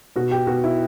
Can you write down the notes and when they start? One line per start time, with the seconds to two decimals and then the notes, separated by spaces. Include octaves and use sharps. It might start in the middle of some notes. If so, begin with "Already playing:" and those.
0.16 B2 F#4
0.31 G4
0.47 B2 F#4
0.64 E4